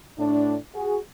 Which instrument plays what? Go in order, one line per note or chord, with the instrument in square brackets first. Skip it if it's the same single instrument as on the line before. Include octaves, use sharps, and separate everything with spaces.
[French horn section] A2 D4
F#4 G#4